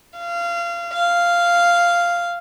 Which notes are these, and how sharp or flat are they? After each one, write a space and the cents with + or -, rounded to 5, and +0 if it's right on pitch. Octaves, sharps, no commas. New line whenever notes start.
F5 -25
F5 -5